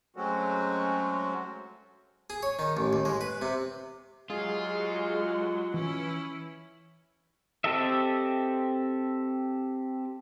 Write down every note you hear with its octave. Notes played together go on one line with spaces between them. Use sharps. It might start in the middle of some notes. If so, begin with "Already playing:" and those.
F#3 G#3 A3 C4 C#4 F#4
G#4
C#5
D#3
A1
D#2
G#3
B4
C3
F#3 G#3 F4 G4 G#4
E3 C#4 E4
C4 G4 A4 D#5 E5